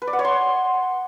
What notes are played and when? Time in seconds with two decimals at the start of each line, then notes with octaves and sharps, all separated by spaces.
0.02 B4
0.07 D5
0.13 F#5
0.19 C#5
0.25 C6